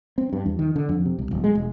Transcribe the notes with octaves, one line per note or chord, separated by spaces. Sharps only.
C4
G2
E2
D#3
D3
F2
C3
C2
D1
G#3
E1